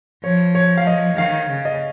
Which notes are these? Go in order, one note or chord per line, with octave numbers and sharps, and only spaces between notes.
F3 C#5
C#5
F5
D#5
D#3 F5
C#3
D#5